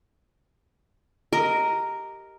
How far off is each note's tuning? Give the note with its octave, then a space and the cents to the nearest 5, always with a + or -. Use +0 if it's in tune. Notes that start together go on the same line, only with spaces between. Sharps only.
G4 +0 A#4 -5 D#5 +10